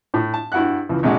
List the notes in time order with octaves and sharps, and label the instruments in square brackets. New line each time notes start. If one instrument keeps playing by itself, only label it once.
[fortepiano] A2
A5
G2 E4 F#4 F#5 F#6
C#2 E3 F3
A#1 C3 G#3 D4 F#4